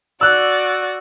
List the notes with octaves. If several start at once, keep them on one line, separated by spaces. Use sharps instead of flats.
F#4 D5 E6 F#6